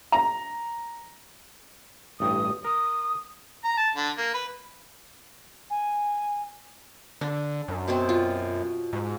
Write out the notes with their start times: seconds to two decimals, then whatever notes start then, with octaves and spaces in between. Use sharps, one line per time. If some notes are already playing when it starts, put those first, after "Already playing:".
0.12 A#5
2.20 A1 G2 G5 D#6
2.65 A#4 D#6
3.64 A#5
3.77 A5
3.96 D3
4.18 A#3
4.34 B4
5.70 G#5
7.21 D3 D4
7.68 F#2
7.88 B2 F#3 C4
8.09 F4
8.93 G#2